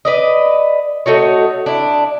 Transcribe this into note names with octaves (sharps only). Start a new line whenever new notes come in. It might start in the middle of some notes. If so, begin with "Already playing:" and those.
B4 D5 D#5
A3 D#4 F#4 C#5
D4 E4